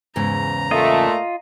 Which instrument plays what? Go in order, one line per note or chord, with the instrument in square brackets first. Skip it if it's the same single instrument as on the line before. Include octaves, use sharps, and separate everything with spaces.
[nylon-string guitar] E2 G#2 C#3 [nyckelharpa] A#5
[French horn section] A#2 A3 [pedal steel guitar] F4 D#5